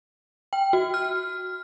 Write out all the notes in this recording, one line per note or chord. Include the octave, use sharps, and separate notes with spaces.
G5
F#4
F6